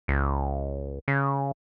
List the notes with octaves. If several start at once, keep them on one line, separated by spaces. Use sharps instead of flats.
C#2
C#3